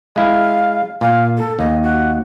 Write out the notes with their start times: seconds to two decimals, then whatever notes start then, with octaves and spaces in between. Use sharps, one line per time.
0.16 G#3 E4 F5
1.01 A#2 F5
1.37 A4
1.59 D#2 D#5
1.83 F#4